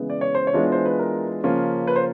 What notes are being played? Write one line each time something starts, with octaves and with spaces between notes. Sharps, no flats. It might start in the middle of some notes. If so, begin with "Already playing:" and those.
Already playing: C#3 E3 G#3 B3
D5
C#5
C5
C#5
E3 G#3 B3 D4 F4
C5
B4
A#4
C#3 F3 A#3 C#4 F4
B4
C5